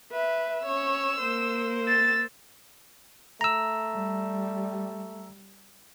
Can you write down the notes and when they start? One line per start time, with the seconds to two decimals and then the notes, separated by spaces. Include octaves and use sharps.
0.12 B4 E5
0.66 C#4 C#5 E6
1.20 A#3 C5
1.85 E6 A6
3.41 A3 A#5 E6
3.94 G3